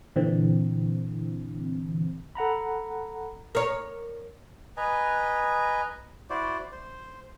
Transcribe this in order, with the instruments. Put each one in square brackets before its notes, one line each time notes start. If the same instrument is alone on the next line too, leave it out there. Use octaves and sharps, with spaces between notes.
[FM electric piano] A#2 D3 E3 C4
[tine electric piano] A4 F#5 A#5 B5
[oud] A#4 C#5
[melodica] B4 D#5 G#5 A#5
E4 F#4 C5 D5
C5